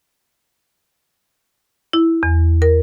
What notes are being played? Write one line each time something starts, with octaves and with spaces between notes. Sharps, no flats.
E4
E2
A#4